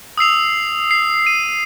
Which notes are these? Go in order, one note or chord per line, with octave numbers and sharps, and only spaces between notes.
D#6 E6 C7 F7
C7
D#7